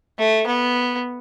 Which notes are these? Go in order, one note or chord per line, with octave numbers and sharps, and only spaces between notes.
A3
B3